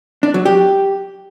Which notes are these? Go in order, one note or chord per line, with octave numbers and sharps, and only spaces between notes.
D4
F#3
G4